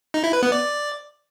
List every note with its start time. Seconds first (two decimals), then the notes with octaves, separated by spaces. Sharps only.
0.14 D#4
0.24 E4
0.33 B4
0.43 B3
0.52 D5